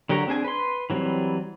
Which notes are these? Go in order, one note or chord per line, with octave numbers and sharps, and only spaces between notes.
D3 F#3 G4 A#4 C#5
C4 D4 G#4 G#5
B4 C6
E3 F#3 G3 C4